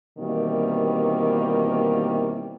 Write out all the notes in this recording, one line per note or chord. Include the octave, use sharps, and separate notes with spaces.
B2 D#3 E3 G3 A#3 C4